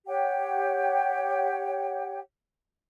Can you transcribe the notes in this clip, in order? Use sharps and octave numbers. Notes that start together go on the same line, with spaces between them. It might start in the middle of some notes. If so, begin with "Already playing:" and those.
G4 C#5 F#5 G5